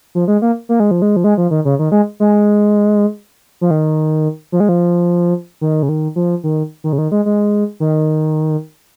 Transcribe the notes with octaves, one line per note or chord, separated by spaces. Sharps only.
F3
G#3
A#3
A#3
G#3
F3
G#3
F3
G#3
F3
D#3
C#3
D#3
G#3
G#3
F3
D#3
F3
G#3
F3
D#3
C#3
D#3
F3
D#3
D#3
C#3
D#3
G#3
G#3
D#3